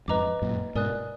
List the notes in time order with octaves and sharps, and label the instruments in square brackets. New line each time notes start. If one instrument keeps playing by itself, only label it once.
[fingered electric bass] F2 G#2 [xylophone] B4 D#5 A#5 D6
[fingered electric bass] F#2 A#2
[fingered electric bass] G#2 B2 [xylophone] A#4 D5 G#5 D#6 F#6